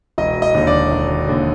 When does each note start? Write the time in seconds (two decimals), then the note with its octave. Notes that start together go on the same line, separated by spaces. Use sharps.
0.18 E1 D#5
0.42 D#5
0.54 D#2 D3
0.67 D5
0.91 E1
1.28 D#2 D3